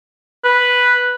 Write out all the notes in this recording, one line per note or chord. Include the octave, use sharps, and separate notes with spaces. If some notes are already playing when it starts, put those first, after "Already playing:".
B4